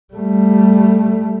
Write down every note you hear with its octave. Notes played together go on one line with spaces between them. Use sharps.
G3 A3